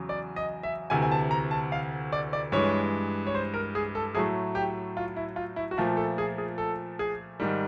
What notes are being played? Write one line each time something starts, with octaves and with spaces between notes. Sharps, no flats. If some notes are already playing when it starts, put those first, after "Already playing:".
Already playing: E2 C#3 F#3
D5
D#5
E5
D2 C3 E3 G#5
G#5
A5
A#5
A5
F5
D5
D5
G2 E3 G#3 C#5
C#5
C5
A#4
G#4
A4
A2 F#3 A3 G#4
G4
F4
E4
F4
E4
F#4
A#2 F3 A3 F4
A4
G#4
G#4
A4
G#4
G#2 D#3 G3